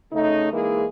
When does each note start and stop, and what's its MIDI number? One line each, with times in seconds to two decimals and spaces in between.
0.12 0.51 49
0.12 0.51 57
0.12 0.51 63
0.52 0.84 52
0.52 0.84 56
0.52 0.84 58
0.52 0.84 63
0.52 0.84 64
0.52 0.84 68